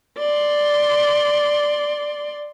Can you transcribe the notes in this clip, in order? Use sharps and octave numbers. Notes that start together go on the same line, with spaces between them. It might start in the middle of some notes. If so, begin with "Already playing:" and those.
D5 C6